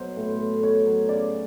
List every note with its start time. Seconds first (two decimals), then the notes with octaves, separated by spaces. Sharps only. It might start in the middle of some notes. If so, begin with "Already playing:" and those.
Already playing: B2 F#3 C5
0.17 A2
0.39 A2
0.63 B2 C#5
0.86 F#3
1.09 C#3 D5